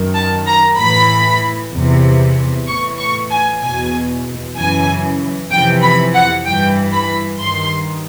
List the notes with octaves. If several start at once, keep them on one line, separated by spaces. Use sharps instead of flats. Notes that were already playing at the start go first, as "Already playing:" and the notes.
Already playing: F#2 D#3
A5
A#5
A2 E3 B5
E2 C3 E3
A2 E3 C#6
C#6
G#5
E2 B2 G#5
F#2 C#3 E3 G#5
F2 C3 E3 G5
B5
F#5
G2 E3 G5
B5
G2 D#3 C6